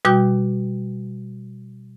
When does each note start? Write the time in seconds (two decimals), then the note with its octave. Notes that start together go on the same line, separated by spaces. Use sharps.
0.05 B2 G3 F#4 G5 D6 G6